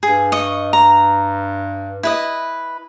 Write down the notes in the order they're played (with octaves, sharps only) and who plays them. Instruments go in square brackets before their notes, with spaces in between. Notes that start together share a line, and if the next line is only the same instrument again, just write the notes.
[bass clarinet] G2 [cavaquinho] G#4
[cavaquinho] D#5 C#6
A#5
E4 B4 D#5